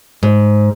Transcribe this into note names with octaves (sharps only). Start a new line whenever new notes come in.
G#2